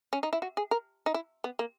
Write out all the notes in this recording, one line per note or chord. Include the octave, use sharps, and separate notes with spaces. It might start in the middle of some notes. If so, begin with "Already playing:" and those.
C#4
D#4
E4
F#4
G#4
A#4
D#4
E4
B3
A#3